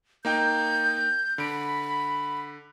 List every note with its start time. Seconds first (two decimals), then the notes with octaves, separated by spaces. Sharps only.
0.25 A#3 D#4 G5 G6
1.38 D3 B5 D7